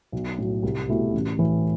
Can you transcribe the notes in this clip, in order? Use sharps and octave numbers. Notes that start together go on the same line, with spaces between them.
B1
A2 F#3
C2
B2 A3 E4 G4
A1
A2 E3